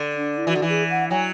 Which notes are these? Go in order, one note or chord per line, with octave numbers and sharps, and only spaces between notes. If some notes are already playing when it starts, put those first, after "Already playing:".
Already playing: D3
D4
E4
E3 F#4
D3
E3
G#4
F#5
F#3 G#5